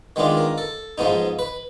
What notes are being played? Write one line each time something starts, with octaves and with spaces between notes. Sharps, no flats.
D#3 G#3 B3 D4 F4
A#4
A4
G#2 F3 G#3 B3 D#4
B4